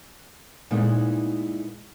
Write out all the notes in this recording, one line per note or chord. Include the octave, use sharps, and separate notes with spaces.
A#2 G#3 B3 D#4 E4